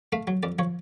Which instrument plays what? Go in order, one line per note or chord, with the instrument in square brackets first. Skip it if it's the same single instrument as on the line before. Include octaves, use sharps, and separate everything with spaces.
[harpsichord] A3 F5
F#3
F2 D5
F3 C#5